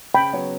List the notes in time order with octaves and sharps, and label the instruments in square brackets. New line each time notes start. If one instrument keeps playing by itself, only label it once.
[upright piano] C#3 [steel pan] G5 B5
[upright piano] F#3 B3 F#4 C#5